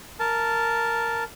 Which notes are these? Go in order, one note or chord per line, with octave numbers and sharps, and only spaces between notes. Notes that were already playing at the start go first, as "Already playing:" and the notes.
A#4 A5